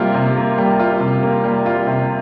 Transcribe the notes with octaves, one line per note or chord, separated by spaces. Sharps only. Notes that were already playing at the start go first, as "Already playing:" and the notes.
Already playing: C3 G3 A#3 F4
C3
A#3
G3
F4
C3
A#3
G3
F4
C3